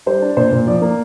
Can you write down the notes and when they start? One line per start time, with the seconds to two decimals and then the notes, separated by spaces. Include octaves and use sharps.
0.06 G3 C5
0.22 D4
0.37 A#2 C5
0.52 A#2
0.67 F3 D5
0.82 A#3